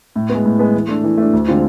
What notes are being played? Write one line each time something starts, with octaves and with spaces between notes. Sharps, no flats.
A2
B3
G#3
A2
G#3 B3
E3
A3 D4
E3
A3 D4
D2
D3 G#3 C4 F4